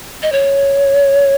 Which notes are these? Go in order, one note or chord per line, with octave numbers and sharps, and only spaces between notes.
D#5
C#5